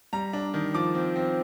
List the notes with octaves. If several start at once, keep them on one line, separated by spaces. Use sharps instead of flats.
G3 A#5
D4
D#3
F3 D6
C4
C4